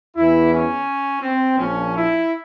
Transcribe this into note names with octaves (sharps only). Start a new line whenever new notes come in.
E2 E3 E4
C#4
C4
A#1 A#2 F3 C#4
E4